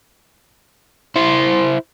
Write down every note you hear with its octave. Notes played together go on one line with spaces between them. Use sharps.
E4 C5